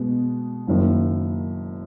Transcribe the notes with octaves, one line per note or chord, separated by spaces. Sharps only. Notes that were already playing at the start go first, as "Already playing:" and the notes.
Already playing: B2 G#3 B3
F#1 F#2 D#3 A#3